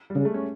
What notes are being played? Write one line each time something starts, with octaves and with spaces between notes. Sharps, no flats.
G3
C#3 G#3
A3
C#4